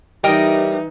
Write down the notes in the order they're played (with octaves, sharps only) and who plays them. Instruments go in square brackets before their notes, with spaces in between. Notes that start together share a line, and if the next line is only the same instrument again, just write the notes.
[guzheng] E3 D5 [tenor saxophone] G3 [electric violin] D#4 [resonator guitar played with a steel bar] A#4 D#5 G5